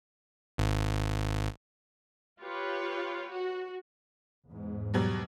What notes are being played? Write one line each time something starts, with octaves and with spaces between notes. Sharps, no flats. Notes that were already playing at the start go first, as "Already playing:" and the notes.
G#1
F4 G4 B4 C#5
F#4
E2 G#2
B2 F#3 G3